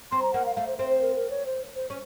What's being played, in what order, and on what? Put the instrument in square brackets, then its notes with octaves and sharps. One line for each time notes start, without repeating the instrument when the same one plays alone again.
[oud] C4 [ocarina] C6
[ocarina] A#5
[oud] A#3 [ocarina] F#5
[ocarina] F5
[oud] A3 [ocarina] F5
[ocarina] C5
[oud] C4 [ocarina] C5
[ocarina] C5
A#4
A#4
C#5
C5
C5
[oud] C#4